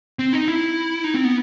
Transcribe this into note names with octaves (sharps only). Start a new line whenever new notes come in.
C4
D#4
E4
D#4
C4
B3